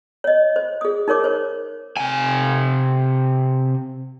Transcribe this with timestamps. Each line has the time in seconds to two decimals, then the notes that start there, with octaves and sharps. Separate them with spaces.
0.24 C#5 D#5
0.56 C5
0.81 G#4 D#6
1.08 D#4 A#4 C#5 D6
1.24 C5 C#5
1.97 C3 G#5